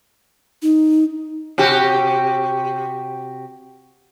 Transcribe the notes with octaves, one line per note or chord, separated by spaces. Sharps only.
D#4
C3 F#4 G4